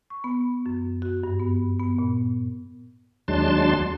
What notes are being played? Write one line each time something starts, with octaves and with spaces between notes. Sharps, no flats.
C#6
B3
F#2
F#4
G2
B3
B3
A#2
D#2 F#3 G#3 D4 A5 C6